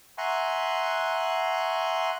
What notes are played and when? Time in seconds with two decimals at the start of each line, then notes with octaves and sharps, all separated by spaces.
0.18 E5 F#5 G#5 A#5 C6 C#6